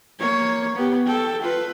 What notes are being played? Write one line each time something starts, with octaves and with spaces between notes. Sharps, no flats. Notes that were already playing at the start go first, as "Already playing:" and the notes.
A#3 C#5
B3 G4
A4 G5
F4 B4